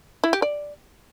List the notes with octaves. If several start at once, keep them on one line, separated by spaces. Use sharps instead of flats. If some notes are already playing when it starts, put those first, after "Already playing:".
E4
G4
D5